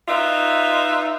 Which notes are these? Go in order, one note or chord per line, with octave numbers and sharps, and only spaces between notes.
D#4 F4 B4 D#5 E5